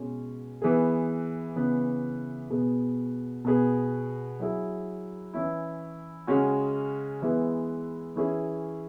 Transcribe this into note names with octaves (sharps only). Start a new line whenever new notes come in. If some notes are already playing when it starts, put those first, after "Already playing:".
Already playing: B2 G#3 C#4
E3 B3 G#4
C#3 E3 B3
B2 B3 G#4
B2 B3 G#4
F#3 E4 G#4
E3 C#4 E4
C#3 G#3 C#4 F#4
E3 G#3 B3 E4
E3 C#4 E4 G#4